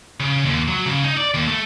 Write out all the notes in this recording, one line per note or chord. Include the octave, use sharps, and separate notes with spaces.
C#3
D#2
F#3
C#3
D#4
D5
D#2
A3